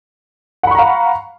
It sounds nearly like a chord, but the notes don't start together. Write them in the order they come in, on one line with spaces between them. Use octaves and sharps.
F#5 B5 C#6 A#5 F5